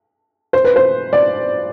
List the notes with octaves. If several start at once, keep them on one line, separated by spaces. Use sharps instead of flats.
C5
B4
C5
D5